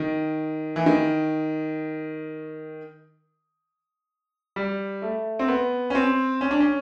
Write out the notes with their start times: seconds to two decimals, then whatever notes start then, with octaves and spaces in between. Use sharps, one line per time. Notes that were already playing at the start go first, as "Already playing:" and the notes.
Already playing: D#3
0.76 E3
0.86 D#3
4.56 G3
5.02 A3
5.39 C4
5.48 B3
5.90 C#4
5.95 C4
6.41 C#4
6.51 D4
6.60 C#4